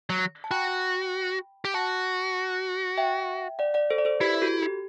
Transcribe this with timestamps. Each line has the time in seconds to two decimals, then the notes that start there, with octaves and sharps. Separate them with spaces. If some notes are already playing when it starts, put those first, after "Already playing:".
0.10 F#3
0.44 A5
0.51 F#4 G5 B5
1.65 G4
1.74 F#4 F#5 A5
2.98 E5 G5
3.59 D5 F#5
3.74 D5 F#5
3.90 A4 C5
3.98 D5
4.05 A4 C5
4.20 E4 G4 B4
4.41 F#4 A4
4.63 G4